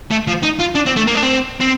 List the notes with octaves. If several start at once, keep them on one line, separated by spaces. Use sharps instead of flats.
A3
F3
D#4
F4
D4
C4
A3
A#3
D4
C4
C4